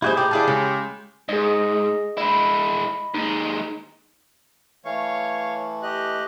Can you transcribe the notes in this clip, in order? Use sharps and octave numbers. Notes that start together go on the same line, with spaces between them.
G3 D#4 E4 F#4 G#4 C5
A2 G#3 G4 A#5
D3 E4 G#4 D5 F5 A5
C#3 G#3
G#2 G#4 D#5
G#3 E4 D#5 B5
D#2 G#3 D#4
E3 A3 C#5 F5 C#6
G4 D#5 F#6